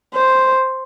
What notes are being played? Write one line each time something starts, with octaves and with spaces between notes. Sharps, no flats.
C5